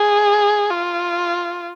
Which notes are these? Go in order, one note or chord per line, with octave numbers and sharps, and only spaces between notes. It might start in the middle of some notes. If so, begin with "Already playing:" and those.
Already playing: G#4
F4